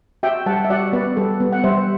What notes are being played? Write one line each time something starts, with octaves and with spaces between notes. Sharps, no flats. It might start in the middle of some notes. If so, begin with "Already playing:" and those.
F#4 E5 G5
G3 F#5 A5
E5
F#4 D5 F#5
B3 B4 D5
G3 A4
B3
F#5
G3 C5 E5